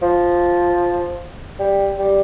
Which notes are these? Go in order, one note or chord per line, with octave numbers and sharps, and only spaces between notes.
F3
G3
G3